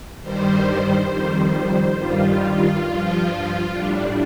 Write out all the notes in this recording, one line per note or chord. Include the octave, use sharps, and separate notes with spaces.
G2 D#3 G3 C5
F2 D#3 G3
G2 D#3 G3 F4
G2 F3
A2 G3 D4